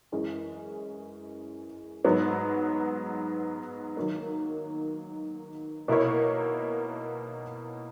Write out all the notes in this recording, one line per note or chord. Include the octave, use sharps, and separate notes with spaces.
F#2 E3 G#3 C#4
G#2 F#3 B3
D#3 F#3 A#3 D#4
B2 A#3 E4 A#4 C#5